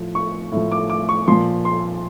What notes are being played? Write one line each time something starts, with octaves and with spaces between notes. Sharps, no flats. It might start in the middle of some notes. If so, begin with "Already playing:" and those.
Already playing: A2 F3
C#6
A2 F3
D6
D6
C#6
A#2 F3 C6
C6